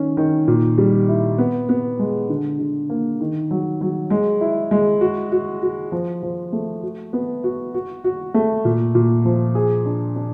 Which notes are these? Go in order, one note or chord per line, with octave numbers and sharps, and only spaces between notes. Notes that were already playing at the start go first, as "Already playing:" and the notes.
Already playing: D#3 C#4
D#3
A#2
G3
E4
B3
B3
G#3
D3
D3
A#3
D#3
F#3
F#3
G#3
E4
G#3
F#4
F#4
F#4
F3
F3
A3
F#4
B3
F#4
F#4
F#4
A3
A#2
A#2
F3
G#4
D4
D4